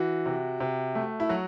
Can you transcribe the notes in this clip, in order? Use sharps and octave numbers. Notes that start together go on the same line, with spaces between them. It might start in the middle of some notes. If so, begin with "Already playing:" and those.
Already playing: E3 F#4
C3
C3
A3
E4
F#3 F#4